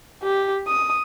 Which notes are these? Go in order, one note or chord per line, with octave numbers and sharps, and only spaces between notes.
G4
D#6